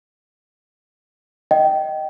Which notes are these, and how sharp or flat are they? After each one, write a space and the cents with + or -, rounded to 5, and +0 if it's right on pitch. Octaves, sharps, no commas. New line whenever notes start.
D#5 +0 G5 -20